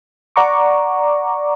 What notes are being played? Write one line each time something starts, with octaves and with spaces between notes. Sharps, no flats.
D5 F#5 A#5 C#6 D6